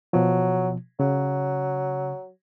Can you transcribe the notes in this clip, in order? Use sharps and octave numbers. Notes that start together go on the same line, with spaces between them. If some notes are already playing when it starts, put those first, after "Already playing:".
B2 F3 F#3
C#3 F#3